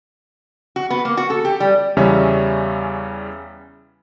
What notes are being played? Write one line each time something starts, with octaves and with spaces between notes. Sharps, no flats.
F#4
B3
A#3
F#4
A4
G4
G3
E2 C#3 G3 C#4 E5